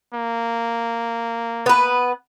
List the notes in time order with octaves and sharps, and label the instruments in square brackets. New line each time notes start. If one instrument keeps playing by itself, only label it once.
[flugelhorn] A#3
[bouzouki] B3 B4